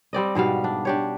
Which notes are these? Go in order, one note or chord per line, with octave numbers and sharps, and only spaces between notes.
G3 C4 D5 D#5
G#2 B2 G3 F5
D4
D4 G4 C#5